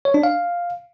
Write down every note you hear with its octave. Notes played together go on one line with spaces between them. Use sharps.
C#5
D4
F5